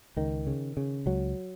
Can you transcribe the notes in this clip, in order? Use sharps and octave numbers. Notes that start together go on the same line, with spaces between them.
C#2 D#3
C#3
C#3
C#2 F#3